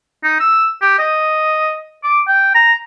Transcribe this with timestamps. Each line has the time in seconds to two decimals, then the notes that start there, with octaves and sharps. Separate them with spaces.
0.24 D#4
0.40 E6
0.82 G4
0.99 D#5
2.04 D6
2.28 G5
2.54 A#5